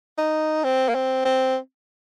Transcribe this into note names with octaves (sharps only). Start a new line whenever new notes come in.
D#4
C4
A#3
C4
C4